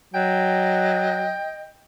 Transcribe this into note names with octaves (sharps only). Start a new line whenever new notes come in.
F#3 D#5 G5